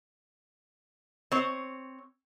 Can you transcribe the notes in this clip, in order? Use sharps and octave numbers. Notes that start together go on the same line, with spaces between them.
C4 C#5